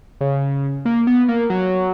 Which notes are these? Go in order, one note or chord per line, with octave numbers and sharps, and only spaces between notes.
C#3
A#3
B3
A#3
F#3